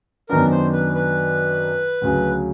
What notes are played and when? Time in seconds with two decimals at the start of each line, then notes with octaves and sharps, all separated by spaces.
0.29 F#2 D#3 F#3 B3 D4 A#4
0.51 C5
0.73 B4
0.95 B4
2.01 D2 C#3 F#3